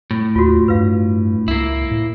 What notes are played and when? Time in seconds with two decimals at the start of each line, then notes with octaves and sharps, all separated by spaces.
0.11 A2
0.36 D#2 F4 F#4
0.68 G2 B4 F5
1.48 C#2 A#3 E4
1.91 A2